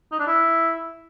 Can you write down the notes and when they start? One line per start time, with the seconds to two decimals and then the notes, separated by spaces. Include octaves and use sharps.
0.12 D#4
0.20 D4
0.28 E4